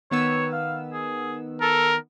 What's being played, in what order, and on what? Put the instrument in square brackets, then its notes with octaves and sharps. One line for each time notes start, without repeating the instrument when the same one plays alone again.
[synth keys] D#3 B3 E6 [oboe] C#5
[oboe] F5
G#4
[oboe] A4 [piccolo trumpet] A#4